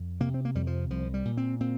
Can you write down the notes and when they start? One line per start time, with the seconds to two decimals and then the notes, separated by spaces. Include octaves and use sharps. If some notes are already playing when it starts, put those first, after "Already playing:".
Already playing: F2
0.20 C3 A#3
0.34 C4
0.45 A#3
0.55 F2 G3
0.67 F3
0.90 C2 F3
1.14 G3
1.25 A#2
1.37 C4
1.60 A#2 C4